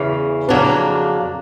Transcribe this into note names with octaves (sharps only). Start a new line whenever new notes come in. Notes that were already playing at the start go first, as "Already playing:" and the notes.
Already playing: E2 C#3 E3
F2 C#3 F#3 A#3 D4